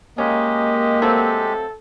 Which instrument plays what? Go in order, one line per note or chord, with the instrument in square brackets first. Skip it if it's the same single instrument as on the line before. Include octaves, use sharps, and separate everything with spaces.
[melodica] G#3 G4 [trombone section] A#3 [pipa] C#4 [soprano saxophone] D#5
[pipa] F#3 A3 C4 [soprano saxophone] A4